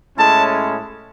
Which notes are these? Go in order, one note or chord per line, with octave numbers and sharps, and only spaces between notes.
A2 G#3 C#4 E4 A5